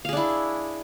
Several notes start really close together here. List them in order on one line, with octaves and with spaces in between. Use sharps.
F5 G#4 D4 E4